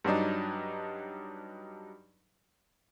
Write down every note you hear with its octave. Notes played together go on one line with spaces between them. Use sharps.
G2 F#3 D4 D#4